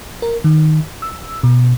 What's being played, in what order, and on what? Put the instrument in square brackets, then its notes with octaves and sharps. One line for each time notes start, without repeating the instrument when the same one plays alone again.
[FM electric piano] A#4
D#3
E6
B2